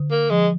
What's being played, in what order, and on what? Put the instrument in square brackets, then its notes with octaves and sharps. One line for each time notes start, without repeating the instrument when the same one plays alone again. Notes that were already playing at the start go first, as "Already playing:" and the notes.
Already playing: [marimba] D3
[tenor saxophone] A#3
[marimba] F3 [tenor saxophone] G#3